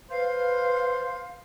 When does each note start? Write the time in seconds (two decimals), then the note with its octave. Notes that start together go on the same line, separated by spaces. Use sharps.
0.10 B4 C5 F5